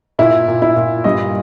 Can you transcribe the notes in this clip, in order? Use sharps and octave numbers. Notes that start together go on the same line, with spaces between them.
A#2 E4
A#2
E4
A#2
G2 D#5